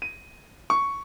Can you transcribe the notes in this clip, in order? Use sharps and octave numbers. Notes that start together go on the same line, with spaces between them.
D#7
C#6